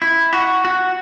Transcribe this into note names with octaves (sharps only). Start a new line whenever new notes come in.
E4
F#4
F#4